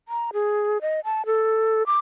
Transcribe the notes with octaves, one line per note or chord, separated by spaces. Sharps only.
A#5
G#4
D#5
A5
A4
D6